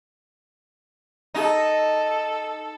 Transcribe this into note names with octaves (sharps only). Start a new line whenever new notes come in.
D#4 A4